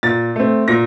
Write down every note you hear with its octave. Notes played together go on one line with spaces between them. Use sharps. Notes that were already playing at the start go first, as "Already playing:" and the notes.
A#2 A6
A3 C4
A#2 A#6